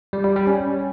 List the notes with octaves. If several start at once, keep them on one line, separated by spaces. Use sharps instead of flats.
G3
G3
G3
C#4